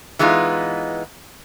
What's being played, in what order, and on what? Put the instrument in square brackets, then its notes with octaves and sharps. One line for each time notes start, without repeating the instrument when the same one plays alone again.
[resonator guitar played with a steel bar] E3 G#3 B3 D#4 F4